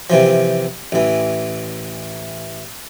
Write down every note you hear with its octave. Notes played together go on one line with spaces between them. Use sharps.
C3 E3 F3
A1 E3